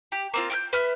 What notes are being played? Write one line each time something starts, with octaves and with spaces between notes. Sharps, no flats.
G4
A#3 C4 F4
G5 F6 G6
B4 E5 F6